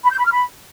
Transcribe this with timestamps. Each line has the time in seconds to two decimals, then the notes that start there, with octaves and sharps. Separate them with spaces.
0.04 B5
0.11 G6
0.18 B5
0.25 F6
0.32 B5